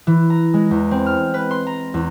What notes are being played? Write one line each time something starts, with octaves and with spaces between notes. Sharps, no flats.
E3
A#5
G#3
E2
C4
F6
B4
C6
A#5
E2